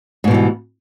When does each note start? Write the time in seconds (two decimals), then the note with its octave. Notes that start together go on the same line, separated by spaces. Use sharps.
0.24 G#2
0.27 B2
0.31 E3
0.34 G3